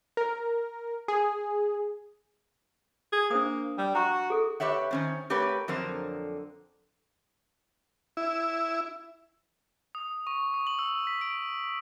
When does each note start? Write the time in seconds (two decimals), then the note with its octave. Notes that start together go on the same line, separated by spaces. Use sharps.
0.17 A#4
1.08 G#4
3.13 G#4
3.30 A#3 D4 C5 D#6
3.78 G3
3.95 F#4 A#5 C#6
4.30 G#4 A4
4.60 G4 B4 C#5 E5 F#5
4.91 D#3 C#4 C5
5.30 A3 G4 A#4 B4 C#5 F#5
5.68 F2 D3 F#3 A#4 C5
8.17 E4
9.95 D#6
10.27 C#6
10.54 D#6
10.67 F#7
10.79 E6
11.07 B6
11.21 D7